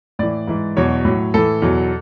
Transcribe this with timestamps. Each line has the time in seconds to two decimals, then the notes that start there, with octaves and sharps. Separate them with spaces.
0.19 A2 E3 D5
0.47 G#2 E3
0.77 E2 B2 F#3 C#5
1.05 A2 F#3
1.34 A2 E3 A4
1.62 E2 B2 F#3